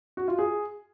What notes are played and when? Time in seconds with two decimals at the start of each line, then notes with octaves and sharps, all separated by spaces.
0.17 F#4
0.28 F4
0.39 G#4